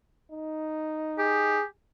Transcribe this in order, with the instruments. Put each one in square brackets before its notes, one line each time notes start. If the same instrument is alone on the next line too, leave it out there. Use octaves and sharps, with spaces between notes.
[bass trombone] D#4
[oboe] G4 [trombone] G#4